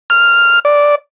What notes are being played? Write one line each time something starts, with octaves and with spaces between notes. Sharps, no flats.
F6
D5